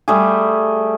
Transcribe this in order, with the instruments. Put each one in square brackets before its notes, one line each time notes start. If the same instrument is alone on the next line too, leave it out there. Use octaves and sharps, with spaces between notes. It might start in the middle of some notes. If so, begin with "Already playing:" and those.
[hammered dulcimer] G3 A3 G#4